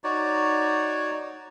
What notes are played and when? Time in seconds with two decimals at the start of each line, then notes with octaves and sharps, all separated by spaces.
0.04 D#4 F#4 C#5 D5